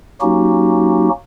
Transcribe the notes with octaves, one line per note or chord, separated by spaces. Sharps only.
F#3 A#3 C#4 D#4 F#4 G4